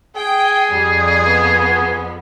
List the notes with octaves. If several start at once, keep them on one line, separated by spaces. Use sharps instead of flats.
G#4 G5
F2 G3
B3